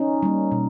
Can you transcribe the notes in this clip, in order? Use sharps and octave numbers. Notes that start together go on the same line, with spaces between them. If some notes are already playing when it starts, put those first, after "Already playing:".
Already playing: C#4 D#4
G3 A#3
B2